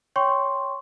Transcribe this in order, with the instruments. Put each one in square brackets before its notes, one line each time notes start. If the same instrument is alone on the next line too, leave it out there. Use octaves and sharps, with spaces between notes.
[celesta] C#5 G5 C6 C#6